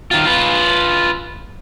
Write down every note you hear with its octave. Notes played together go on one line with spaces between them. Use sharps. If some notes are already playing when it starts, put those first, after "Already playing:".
D#3 F4
F4 B4